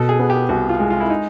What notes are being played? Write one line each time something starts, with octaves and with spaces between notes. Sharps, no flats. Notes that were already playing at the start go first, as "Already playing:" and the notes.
Already playing: B2 A4
G#4
B3
G4
C2 F#4
F4
G#3
F4
E4
D#4